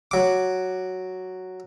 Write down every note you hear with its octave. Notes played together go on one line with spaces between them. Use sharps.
F#3 D6